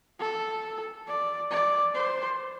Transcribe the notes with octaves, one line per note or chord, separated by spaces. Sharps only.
A4
D5
D5
C5